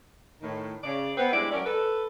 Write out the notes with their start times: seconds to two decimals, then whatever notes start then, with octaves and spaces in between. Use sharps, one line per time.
0.42 A2 D#3
0.84 C#3 D5
1.17 B3 C4 B4
1.33 G3 G#3 D4 E4 C5 D5
1.51 F#3 C#4 A#4 D5
1.66 A4 B4